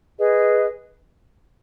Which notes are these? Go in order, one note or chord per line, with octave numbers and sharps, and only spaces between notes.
G#4 B4 D#5